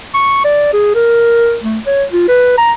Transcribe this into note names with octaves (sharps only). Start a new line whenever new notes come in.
C#6
D5
G#4
A#4
A3
C#5
F4
B4
A#5